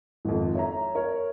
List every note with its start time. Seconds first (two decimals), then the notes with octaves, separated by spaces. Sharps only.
0.25 G#1 F2
0.55 C#5 E5 A#5
0.95 A#4 C#5